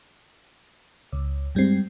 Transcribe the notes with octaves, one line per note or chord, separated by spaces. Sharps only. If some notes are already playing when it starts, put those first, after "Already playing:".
C#2
G2 G3 G#3 C4